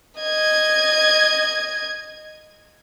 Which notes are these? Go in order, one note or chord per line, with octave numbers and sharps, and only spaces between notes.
D#5 G#6